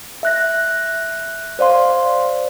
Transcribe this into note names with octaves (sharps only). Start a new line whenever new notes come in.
E5 F#6 A#6
C5 D5 F5 C6